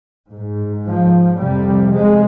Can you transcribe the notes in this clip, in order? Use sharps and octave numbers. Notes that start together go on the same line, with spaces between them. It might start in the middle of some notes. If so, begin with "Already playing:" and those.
G#2
F3
F2 C3 G3
G#3